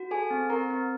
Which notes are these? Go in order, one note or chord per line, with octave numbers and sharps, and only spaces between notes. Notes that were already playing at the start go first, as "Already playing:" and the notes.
Already playing: F#4
G#4 A4 G#5
C4
C4 A#4 A#5
C4